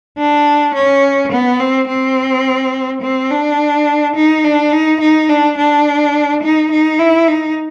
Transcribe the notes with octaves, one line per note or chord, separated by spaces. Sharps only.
D4
C#4
B3
C4
C4
C4
D4
D#4
D4
D#4
D#4
D4
D4
D#4
D#4
E4
D#4